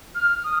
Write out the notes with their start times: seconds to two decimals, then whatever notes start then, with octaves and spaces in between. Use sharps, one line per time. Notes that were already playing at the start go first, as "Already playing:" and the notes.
0.15 F6
0.44 D#6